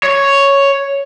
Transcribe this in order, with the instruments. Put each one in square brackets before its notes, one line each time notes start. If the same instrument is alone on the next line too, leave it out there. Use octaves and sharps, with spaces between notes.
[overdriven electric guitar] C#5